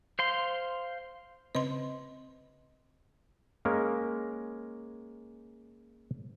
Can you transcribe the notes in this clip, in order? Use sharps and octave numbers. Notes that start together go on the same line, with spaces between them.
C5 F5 C6
C#3 C4 B4 D#5 C6
G#3 A#3 C#4 A#4